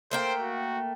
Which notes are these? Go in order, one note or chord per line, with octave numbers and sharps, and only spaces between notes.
A3 A#3 C5 G5
F#4